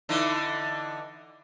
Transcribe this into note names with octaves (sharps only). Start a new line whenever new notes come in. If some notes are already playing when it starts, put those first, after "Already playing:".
D3 E3 D#4